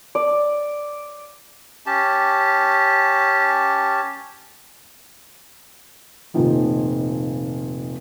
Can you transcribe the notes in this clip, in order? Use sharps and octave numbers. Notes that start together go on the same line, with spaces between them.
D5
C#4 G4 A5
F1 A#2 D#3 F3